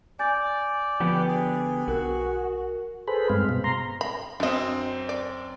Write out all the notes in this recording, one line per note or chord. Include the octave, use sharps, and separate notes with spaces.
D5 G#5 G6 A6
D3 F3 B3 G4
G#4
B1 F#4 A#4
G#4 A4 B4 C5 B5
G2 G#3 C4 F5
B2
A#5 C6
B5
F#2 C4 D4 D#5
D5